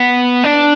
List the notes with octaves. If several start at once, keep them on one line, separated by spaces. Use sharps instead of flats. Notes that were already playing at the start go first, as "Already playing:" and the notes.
Already playing: B3
D4